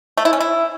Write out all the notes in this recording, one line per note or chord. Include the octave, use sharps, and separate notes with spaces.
A3
E4
C#4
E4